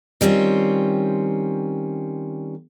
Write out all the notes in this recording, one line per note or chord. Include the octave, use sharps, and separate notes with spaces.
D#3 G3 C4 C#4 F4